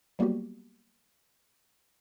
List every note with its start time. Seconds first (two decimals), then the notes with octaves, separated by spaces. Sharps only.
0.19 F#3 G3 A#3 B3 F#4 G4